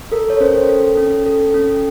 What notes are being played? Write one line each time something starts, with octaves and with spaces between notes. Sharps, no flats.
A4 A#4
C#5
C#4 C5
A4
C#4
A4
C#4